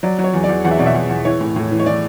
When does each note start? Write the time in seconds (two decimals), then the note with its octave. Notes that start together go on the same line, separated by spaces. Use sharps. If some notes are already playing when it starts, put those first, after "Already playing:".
0.03 F#3 D5
0.19 F#3
0.24 C#5
0.34 E2
0.44 D5
0.49 E2
0.65 E2 F#5
0.71 E5
0.79 B2 D5
0.86 E5
0.95 E2
1.09 E2
1.25 E3 C#5
1.41 A2
1.56 A2
1.71 E3
1.80 C#5
1.86 E3 D5